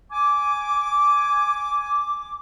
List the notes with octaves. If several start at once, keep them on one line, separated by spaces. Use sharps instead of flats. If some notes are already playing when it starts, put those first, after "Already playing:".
G#5 D6